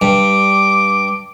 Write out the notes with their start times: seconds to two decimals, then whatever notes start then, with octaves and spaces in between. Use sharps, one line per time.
0.02 G2 D6